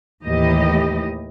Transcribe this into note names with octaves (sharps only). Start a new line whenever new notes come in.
D#2 A2 E3 G4 D#5